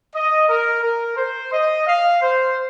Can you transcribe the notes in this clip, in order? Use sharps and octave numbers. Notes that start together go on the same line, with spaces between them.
D#5
A#4
A#4
C5
D#5
F5
C5